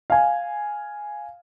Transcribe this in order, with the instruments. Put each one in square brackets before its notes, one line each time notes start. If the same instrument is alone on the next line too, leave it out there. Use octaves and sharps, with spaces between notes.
[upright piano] F5 G#5